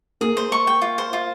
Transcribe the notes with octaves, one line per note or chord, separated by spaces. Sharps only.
A#3 G#4
C5
C#6
G5
F4
C5
F4